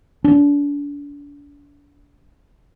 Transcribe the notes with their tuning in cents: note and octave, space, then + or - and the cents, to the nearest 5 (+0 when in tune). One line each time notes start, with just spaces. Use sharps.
D4 -35